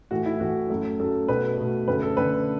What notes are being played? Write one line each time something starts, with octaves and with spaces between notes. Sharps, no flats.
A2 E3 A3 F#4
E4
A2 E3 A3 F#4
F#2 F#3 A3
F#2 F#3 A3 A4
B2 A3 B4
B2 A3
F#2 D3 A3 B4
A4
F#2 D3 A3 B4